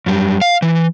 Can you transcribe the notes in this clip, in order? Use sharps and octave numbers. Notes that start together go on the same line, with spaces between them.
F#2 G3
F5
E3